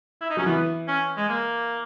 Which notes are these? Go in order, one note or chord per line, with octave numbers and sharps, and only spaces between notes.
E4
D#4
F#3 C#4
E3 B3
C#4
G#3
A#3